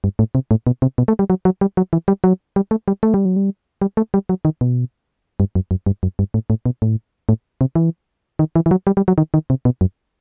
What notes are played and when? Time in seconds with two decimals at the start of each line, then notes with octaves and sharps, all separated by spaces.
0.04 G2
0.19 A2
0.35 C3
0.51 A2
0.67 B2
0.82 C3
0.98 B2
1.08 A3
1.19 G3
1.30 F#3
1.45 F#3
1.61 G3
1.77 F#3
1.93 E3
2.08 G3
2.24 F#3
2.56 G3
2.71 A3
2.88 G3
3.03 A3
3.14 G3
3.25 F#3
3.36 G3
3.82 G3
3.97 A3
4.14 G3
4.29 F#3
4.45 D#3
4.61 B2
5.40 G2
5.55 F#2
5.71 F#2
5.86 G2
6.03 F#2
6.19 G2
6.34 A2
6.50 A2
6.66 B2
6.82 A2
7.29 A2
7.61 C3
7.76 E3
8.39 D#3
8.56 E3
8.66 E3
8.71 F#3
8.87 G3
8.97 G3
9.08 F#3
9.18 D#3
9.34 D#3
9.50 C3
9.65 B2
9.81 F#2